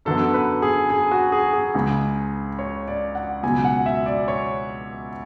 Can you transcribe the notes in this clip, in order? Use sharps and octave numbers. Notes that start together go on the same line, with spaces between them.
F#2 D3 F#3 B3 A4
B4
G#4
G#4
F#4
G#4
G#4
C#2 C#3 G#3
C#5
D5
F#5
C#2 B2 F#3 G#5
F#5
E5
D5
C#5